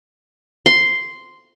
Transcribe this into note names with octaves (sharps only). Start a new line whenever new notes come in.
C6